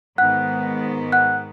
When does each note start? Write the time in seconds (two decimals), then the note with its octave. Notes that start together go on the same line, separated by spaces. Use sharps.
0.18 G#2 D#3 B3 F#5 F#6
1.12 F#5 F#6